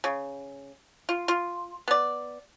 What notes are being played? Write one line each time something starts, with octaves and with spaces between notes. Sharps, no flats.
C#3
F4
F4
B3 D5